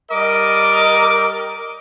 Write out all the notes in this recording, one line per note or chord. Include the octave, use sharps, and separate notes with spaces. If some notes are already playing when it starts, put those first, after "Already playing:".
G3 A#4 D#5 D6